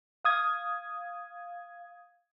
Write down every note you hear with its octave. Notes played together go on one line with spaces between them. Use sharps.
F5 D#6 G#6